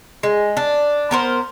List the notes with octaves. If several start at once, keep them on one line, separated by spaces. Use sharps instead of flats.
G#3
D4
B3 A#4 C5